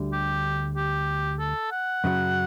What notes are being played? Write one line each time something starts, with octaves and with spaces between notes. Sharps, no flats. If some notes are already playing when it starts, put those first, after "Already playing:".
Already playing: D2 D3 G3
G4
G4
A4
F#5
F#2 C#3 F#3